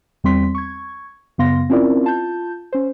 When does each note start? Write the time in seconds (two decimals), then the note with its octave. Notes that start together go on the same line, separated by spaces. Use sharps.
0.24 E2 G3 C4 C6 B6
0.55 C#6 G#6
1.38 F#2 C#3 B3 F5 C6 A#6
1.70 C4 C#4 E4 F4 A#4 D5
2.04 F4 A5 G6
2.73 C#4 C5